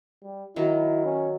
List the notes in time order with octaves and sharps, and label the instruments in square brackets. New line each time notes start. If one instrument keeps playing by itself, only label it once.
[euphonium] G3
[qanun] D#3 F#3 [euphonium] E4
[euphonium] C#4